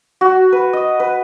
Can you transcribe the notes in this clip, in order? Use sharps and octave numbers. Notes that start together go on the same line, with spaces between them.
F#4
B4
D#5
B4